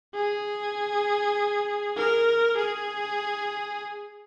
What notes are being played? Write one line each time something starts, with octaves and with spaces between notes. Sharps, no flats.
G#4
A#4
G#4